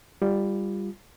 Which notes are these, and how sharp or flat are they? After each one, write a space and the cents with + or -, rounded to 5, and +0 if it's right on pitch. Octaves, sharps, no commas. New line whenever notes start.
G3 +15 F4 -5